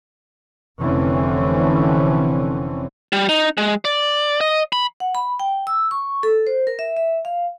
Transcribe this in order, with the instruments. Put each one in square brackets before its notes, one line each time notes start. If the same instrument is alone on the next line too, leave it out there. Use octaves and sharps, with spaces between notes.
[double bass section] F1 D3 E3 C4 C#4
[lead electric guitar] G3
D#4
G#3
D5
D#5
B5
[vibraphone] F#5
B5
G5
E6
C#6
A4
C5
A#4
E5
E5
F5